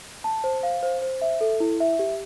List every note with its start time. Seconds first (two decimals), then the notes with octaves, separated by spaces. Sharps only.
0.24 A5
0.44 C5
0.63 F5
0.83 C5
1.02 C5
1.22 E5
1.41 A4
1.60 E4
1.80 E5
1.99 G4